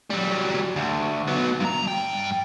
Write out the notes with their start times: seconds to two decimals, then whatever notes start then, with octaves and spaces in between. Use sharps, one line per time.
0.10 F#3 G3
0.76 D2
1.28 F#3 B3
1.61 G2 A#5
1.88 G2 G5